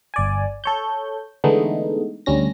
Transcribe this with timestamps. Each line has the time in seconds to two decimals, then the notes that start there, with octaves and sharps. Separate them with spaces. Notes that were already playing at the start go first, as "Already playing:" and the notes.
0.14 G1 D5 G#5
0.64 A4 C#5 G6
1.44 D3 E3 G#3 A3 B3 D#4
2.26 D2 G3 C#4 A#6